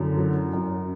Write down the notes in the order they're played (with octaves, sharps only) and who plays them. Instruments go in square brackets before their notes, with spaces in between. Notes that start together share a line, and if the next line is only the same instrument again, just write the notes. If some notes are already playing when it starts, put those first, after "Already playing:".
Already playing: [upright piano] F#2 D3 [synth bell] E4 F#4
[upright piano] F#3
F#2